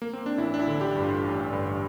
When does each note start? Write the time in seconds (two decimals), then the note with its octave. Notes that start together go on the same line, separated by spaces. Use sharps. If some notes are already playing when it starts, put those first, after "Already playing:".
0.02 A#3
0.13 C4
0.26 D4
0.38 A1 E4
0.54 D4
0.60 E4
0.67 D3
0.81 G4
0.96 G2
1.03 F4
1.24 A1
1.53 G2